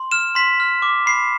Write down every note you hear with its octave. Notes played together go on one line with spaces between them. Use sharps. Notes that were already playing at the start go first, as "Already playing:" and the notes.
Already playing: C6
F6 E7
C6 B6
F6
D6
B5 C7